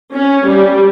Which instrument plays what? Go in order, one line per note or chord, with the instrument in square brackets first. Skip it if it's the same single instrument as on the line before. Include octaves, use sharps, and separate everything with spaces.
[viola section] C#4
G3